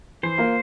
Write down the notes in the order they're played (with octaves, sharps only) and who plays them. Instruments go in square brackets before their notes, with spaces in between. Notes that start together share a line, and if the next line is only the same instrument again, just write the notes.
[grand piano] E3 [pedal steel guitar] C5
[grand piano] A#3 F4 A#4 F5